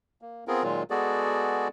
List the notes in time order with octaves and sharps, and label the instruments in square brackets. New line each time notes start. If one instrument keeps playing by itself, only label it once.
[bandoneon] A#3
B3 C4 F4 G#4 A#4
A#2 D#3 F#3 G#3 F4
G#3 B3 F#4 G#4 A4 D5